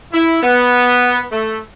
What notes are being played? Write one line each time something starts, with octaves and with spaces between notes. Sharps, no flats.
E4
B3
A3